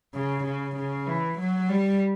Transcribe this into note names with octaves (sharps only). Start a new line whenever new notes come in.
C#3
C#3
C#3
E3
F#3
G3